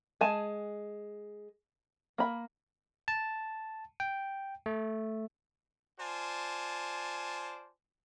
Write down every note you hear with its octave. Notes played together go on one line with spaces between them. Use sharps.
G#3 G#5 A5
A#3 B5
A5
G5
A3
F4 C5 D5 G#5 A5